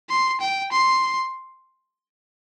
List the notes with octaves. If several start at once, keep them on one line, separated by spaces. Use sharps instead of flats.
C6
G5
C6